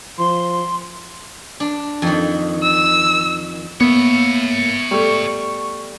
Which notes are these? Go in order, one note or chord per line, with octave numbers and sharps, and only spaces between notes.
F3 C6
D4
F2 D#3
E6
A#3 B3 C#5 E5
G3 A3 C#6